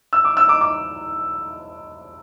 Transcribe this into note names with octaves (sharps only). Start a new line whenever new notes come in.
E6
D6
E6
D6
D6